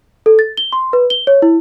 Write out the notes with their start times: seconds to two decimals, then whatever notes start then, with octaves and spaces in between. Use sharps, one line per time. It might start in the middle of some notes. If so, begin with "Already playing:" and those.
0.26 A4
0.39 A6
0.57 G7
0.73 C6
0.93 B4
1.10 G7
1.27 C#5
1.42 E4